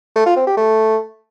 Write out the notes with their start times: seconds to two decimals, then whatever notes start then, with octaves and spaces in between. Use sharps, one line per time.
0.16 A3
0.26 F4
0.37 C4
0.47 G4
0.57 A3